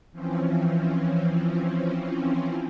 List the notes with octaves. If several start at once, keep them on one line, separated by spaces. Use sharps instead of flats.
E3 F3 C4 C#4